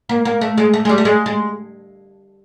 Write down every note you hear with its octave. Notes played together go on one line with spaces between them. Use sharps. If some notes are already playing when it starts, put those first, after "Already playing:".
A#3
A#3
A3
G#3
A3
G#3
G3
A3
G#3
G#3